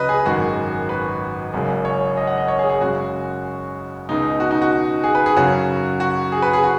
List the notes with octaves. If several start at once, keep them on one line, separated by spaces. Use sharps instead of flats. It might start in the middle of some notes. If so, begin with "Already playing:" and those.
Already playing: C#2 C#3 F#3 B4 D#5
G#4
G#1 F#2 D#3 G#3 F#4
B4
F#1 F#2 C#3 G#3
C#5
D#5
F#5
D#5
C#5
G#4
G#4
F#2 C#3 G#3 F#4
C#2 B2 G#3 D#4
F#4
D#4
F#4
G#4
B4
G#4
F#2 C#3 F#3 F#4
F#4
G#4
B4
G#4
F#4